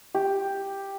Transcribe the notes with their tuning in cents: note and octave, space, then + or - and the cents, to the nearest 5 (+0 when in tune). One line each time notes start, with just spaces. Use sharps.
G4 +5